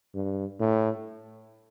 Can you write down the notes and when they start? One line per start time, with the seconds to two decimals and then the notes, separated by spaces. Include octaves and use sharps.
0.15 G2
0.60 A2